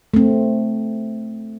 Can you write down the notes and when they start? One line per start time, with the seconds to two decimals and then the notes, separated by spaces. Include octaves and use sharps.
0.14 A3 C4